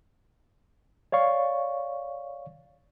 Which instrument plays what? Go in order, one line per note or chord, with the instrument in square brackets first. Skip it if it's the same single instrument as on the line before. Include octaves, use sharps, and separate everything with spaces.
[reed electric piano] C#5 D5 F5 C#6